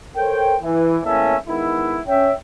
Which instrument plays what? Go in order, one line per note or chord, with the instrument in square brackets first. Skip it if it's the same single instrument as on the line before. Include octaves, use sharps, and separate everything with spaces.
[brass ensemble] A4 A#4 C5 C#5 G5
E3
E2 A2 A#3 C#4 A4 E5
D#3 G#3 B3 E4
C#4 C#5 E5 G5